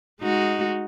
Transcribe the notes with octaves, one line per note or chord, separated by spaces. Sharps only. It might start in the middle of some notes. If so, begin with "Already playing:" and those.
G#3 D#4 F#4